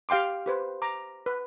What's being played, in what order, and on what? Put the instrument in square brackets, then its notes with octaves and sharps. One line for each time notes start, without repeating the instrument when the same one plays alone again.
[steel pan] G4 F5 G5 C6 D6
G4 B4 C5
A#5 D6
B4